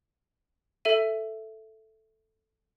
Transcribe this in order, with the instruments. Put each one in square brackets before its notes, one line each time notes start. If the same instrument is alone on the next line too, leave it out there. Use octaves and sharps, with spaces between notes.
[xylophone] A4 E5 D#7